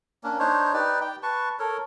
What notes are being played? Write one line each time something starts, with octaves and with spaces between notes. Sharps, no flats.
A#3 C#4 D4
D4 D#4 C5 C#5
D#4 G4 B4 D5
G4 G5
B4 A5 C#6
A4 A#4 C#5